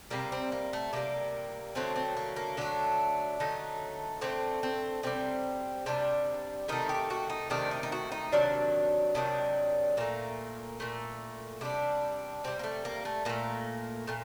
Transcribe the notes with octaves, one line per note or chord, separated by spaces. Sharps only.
C3 G3 A#3
C4
A#3
A3
C3 G3 A#3
D3 F#3 A3 C4
C4
A#3
A#3
D3 F#3 A3 D4
D3 F#3 A3 D#4
D3 F#3 A3 C4
C4
C3 G3 C4
C3 G3 D4
C3 D#3 A3 D#4
G4
F#4
D#4
C3 D#3 A3 D4
D#4
D#4
F#4
D#4
C3 D#3 F#3 D4
C3 D#3 F#3 D4
A#2 A3 A#3
A#2 A3
C3 G3 D4
C3 G3 C4
A#3
A3
A#3
A3
A#2 A3 A#3
A#2 A3